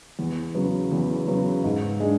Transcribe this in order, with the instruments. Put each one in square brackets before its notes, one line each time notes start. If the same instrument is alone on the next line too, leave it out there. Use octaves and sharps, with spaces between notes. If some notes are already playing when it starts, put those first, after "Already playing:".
[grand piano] E2
C#3 F#3 B3
E2
C#3 F#3 B3
G#2
G#3 D4